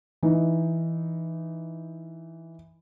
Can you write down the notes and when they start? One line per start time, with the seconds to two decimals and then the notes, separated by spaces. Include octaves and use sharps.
0.23 E3 D#4